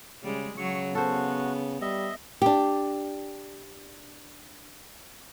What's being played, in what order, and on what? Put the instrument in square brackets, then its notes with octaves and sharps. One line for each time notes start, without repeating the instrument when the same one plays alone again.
[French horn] C#3 [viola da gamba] G3 G#3
[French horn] C#3 [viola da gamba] F#3 [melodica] C#6
[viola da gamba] B3 [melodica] F#4 [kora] A4 C5
[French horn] G3 [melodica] D#5 E5
[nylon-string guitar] D4 G4